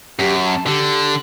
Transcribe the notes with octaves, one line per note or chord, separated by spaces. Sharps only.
F#2 G4
A5
D3 G4